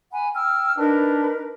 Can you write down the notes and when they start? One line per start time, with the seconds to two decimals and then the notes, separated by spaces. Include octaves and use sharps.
0.12 F#5 G#5 B5
0.34 G5 E6 F6
0.78 D4 D#4 A#4 B4